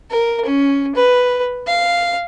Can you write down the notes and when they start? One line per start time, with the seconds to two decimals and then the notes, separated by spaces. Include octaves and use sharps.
0.10 A#4
0.45 C#4
0.95 B4
1.67 F5